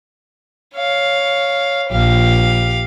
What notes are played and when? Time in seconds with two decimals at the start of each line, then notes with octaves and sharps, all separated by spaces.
0.75 C#5 F5
1.91 A#1 G4 F5